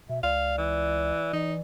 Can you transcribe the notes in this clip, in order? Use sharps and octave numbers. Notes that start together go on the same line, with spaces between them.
B2 E5
C#2 D5 F5
E3
E3 D#4